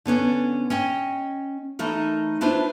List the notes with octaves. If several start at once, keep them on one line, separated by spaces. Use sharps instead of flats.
D3 B3 C#4 D4
C#4 D#5 G5
E3 A3 D#4 A#4
D4 E4 F4 B4 C5